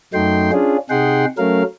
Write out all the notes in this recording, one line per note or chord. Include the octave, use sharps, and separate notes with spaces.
F#2 F#3 A3 D#4 G5 C6
C#4 D4 F4 G#4
C3 D#4 G#4 F#5 G5 C6
F#3 A3 C#4 A#4 F5